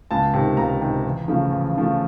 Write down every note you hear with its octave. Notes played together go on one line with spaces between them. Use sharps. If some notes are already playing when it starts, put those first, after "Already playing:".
C#2 A5
C3 D#3
C#2 A#5
C3 D#3
E2
C#3 F3 A3
E2
C#3 F3 A3